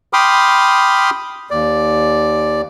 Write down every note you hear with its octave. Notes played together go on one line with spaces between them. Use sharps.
G5 B5 C6 D6 D#6 F6
D#2 D5